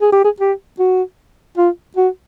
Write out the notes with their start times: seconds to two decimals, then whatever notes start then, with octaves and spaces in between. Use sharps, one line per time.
0.02 G#4
0.13 G4
0.25 G#4
0.41 G4
0.79 F#4
1.58 F4
1.97 F#4